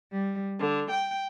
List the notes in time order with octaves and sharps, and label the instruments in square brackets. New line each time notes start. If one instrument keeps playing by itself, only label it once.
[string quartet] G3
D3
G5